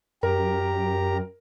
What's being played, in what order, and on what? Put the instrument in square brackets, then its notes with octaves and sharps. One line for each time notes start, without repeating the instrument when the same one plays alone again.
[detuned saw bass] F#2 [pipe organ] G4 A#5 [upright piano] A#4